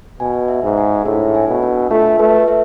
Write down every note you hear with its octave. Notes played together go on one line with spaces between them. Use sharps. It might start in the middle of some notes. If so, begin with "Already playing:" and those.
B2 G#5
E5
G#2
G#5
A2 D4
G#5
B2
D4
A3 F4
A3 B4
E5